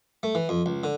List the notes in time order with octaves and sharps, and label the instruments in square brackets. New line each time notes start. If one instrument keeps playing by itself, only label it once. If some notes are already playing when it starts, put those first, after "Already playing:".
[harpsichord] A3
E3
F2
C#2
D3